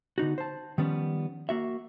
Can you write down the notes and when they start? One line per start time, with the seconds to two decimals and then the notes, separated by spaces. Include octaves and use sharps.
0.18 D3 B3 D#4 F#4
0.38 C5 A5
0.78 D#3 F3 G3 B3 C#4
1.49 A#3 F#4 E5